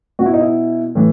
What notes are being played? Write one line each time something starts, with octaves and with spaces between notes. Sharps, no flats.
B2 F#4
E4
D#4
E4
A2 E3